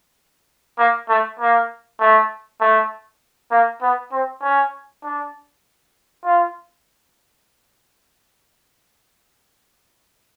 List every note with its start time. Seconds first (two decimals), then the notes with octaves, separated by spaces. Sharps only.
0.78 A#3
1.09 A3
1.39 A#3
2.00 A3
2.61 A3
3.51 A#3
3.82 B3
4.12 C4
4.42 C#4
5.04 D4
6.25 F4